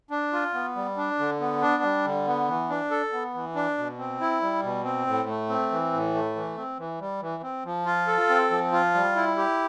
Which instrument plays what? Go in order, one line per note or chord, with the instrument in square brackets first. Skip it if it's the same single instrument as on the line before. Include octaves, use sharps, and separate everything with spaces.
[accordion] D4
F4
B3
G3
D4
D3
B3
D4
G3
D3
B3
E3
D4
A4
B3
E3
D4
B2
C4
E4
G3
B2
C4
A2
A3
C4
E3
A2
A3
E3
C4
E3
G3
E3
C4
F3
F4
A4
C4
F3
F4
G3
E4
G4